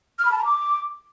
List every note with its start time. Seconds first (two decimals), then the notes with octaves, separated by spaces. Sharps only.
0.19 F6
0.25 B5
0.32 A5
0.38 A#5
0.45 D6